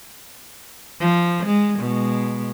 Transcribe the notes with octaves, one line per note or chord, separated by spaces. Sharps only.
F3
G#3
B2 G#3